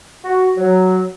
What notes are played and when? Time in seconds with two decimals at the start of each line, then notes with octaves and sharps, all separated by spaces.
0.23 F#4
0.56 F#3